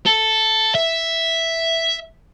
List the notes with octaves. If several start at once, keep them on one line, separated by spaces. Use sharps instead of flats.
A4
E5